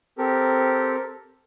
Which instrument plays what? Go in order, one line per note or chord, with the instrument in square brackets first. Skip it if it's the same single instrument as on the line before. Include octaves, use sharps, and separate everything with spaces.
[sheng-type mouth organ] C4 G4 A4 A#4